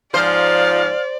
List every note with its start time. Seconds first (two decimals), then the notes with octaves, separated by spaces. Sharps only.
0.14 G#2 F3 C5 D5 F5